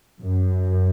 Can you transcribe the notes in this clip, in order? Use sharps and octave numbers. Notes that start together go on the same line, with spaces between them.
F#2